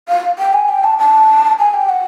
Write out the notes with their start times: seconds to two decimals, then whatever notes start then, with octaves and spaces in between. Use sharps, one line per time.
0.08 F5
0.39 G5
0.53 G#5
0.68 G5
0.84 A5
0.98 A5
1.59 G#5
1.73 G5
1.89 F#5